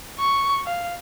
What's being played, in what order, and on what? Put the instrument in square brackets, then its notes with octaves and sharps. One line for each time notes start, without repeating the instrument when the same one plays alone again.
[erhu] C#6
F5